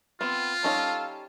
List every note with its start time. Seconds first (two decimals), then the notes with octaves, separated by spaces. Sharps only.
0.21 B3 C4 F4
0.63 G3 C#4 D#4 A4 F5 A5